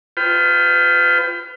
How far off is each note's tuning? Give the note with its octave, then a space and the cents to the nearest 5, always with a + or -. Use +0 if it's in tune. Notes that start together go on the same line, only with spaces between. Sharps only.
F4 +0 B4 +35 G5 +0